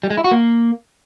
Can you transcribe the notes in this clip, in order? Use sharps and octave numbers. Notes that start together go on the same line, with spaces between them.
G3
G#3
E4
F#4
A#3